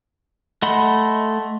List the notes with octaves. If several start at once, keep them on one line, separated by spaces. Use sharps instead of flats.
A3 D#5 F#5 B5 C6